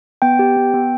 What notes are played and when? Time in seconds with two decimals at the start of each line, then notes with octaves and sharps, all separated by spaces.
0.22 B3 G5
0.39 G4
0.57 B3
0.74 B3